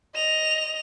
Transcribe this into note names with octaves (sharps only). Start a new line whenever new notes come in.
D#5 F7